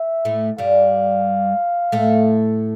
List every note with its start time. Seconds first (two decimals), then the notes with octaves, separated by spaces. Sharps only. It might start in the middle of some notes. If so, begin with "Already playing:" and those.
Already playing: E5
0.25 A2 A3
0.58 G2 G3 F5
1.92 A2 A3